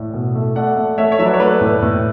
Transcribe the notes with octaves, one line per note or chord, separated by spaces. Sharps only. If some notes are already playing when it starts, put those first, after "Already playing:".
Already playing: A2 D5
B2
A3
A3 D5 F#5
A3
A3 C#5 E5
C#5
F#3 E5
B4 D5
C#5
A3 B4 D5
A2
A2